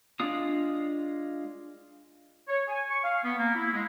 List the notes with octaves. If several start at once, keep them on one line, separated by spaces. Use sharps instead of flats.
G#3 D4 F4 D#6
C#5
G#5
C#6
F5
B3
A#3
E4
G#3